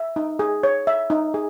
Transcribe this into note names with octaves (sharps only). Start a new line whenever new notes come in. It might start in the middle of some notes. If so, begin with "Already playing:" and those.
Already playing: E5
D#4
G#4
C#5
E5
D#4
G#4